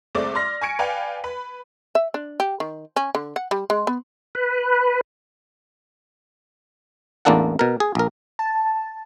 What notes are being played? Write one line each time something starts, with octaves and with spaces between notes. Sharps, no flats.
C2 G#3 A3 C4 D5 D6
D5 C6 F6 A#6
G#5 C#6 G#6 C#7 D7
B4 D5 F5 G5 G#5
B4 B5
E5
D4
G4
D#3
C#4
D3
F#5
G3
G#3
B3
B4
A1 E2 A#3 D4 A4 F#5
B2 A#4
G#4
A#1 A#4
A5